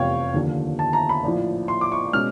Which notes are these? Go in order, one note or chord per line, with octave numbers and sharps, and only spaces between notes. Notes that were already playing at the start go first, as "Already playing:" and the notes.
Already playing: F1 E2 C3 F3 A3 C#5 F5 G5
D#2 D3 F3
A5
A#5
B5
A#1 A2 F3
C6
D6
C#6
B2 G#3 C#4 F6